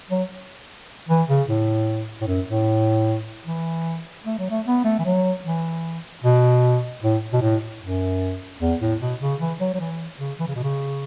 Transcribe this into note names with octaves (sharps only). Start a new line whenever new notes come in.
F#3
E3
C#3
A2
A2
F#2
A2
E3
A3
F#3
A3
B3
A3
E3
F#3
E3
B2
A2
B2
A2
F#2
E2
A2
B2
C#3
E3
F#3
F#3
E3
C#3
E3
C#3
B2
C#3